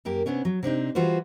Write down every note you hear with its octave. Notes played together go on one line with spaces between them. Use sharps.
F#2 A#3 G4 A#4
C3 B3 C#4 D4
F#3
C3 C4 D4 D#4
E3 G3 F4 F#4 B4 C5